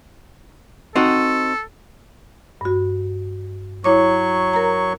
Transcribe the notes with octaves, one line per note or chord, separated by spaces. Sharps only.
C4 D#4 F#4 A4
G2 F#4
F#3 E4 C#5 C#6 D6
A#4 A#5